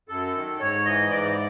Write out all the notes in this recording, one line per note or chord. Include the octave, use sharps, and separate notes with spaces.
F#2 A4
D#3
G#2 C#5
E3 D#5
G#2 D5